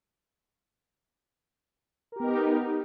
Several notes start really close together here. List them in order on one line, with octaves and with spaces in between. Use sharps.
A#4 G4 B3 D#4